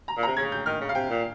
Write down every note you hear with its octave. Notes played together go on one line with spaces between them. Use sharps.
A#5
A#2
A#5
C3
C#3 G#6
G6
D#3 F6
C#3
F5
C3 G5
A#2